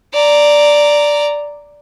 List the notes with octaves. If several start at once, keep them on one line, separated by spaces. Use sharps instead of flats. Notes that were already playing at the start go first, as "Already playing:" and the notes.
D5 A#5